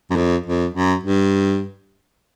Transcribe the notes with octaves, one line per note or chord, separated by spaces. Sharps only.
F#2
F2
F2
F#2
G2